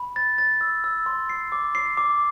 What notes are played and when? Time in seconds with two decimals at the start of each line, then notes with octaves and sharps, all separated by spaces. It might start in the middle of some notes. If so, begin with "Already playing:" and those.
Already playing: B5
0.16 A6
0.38 A6
0.61 E6
0.84 E6
1.06 C6
1.29 C7
1.52 D6
1.75 C7
1.97 D6